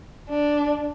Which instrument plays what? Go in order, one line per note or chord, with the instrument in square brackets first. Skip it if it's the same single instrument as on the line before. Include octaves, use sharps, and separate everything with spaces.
[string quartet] D4